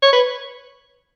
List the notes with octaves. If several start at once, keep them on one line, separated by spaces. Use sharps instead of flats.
C#5
B4